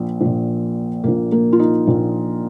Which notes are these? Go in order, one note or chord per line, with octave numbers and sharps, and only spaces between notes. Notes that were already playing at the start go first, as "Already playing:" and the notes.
Already playing: A#1 A#2
A#1 A#2
A#1 A#2 A#3
A#3
F4
D#4
A#1 A#2